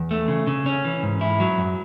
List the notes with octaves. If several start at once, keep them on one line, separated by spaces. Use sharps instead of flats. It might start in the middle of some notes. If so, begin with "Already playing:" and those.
Already playing: E2
A3
C#3
C#3
C#4
E3
G#2
E4
F#3
F#2